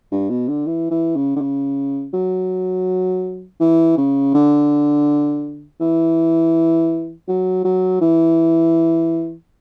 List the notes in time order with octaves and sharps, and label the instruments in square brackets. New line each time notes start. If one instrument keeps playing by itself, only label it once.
[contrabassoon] G2
B2
D3
E3
E3
C#3
D3
C#3
F#3
E3
C#3
D3
E3
F#3
F#3
E3